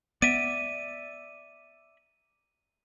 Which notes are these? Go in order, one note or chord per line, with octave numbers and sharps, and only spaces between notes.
B3 D5 E5 D#7